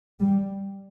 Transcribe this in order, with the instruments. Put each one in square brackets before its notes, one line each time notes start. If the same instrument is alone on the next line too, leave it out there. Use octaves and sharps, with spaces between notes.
[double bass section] G3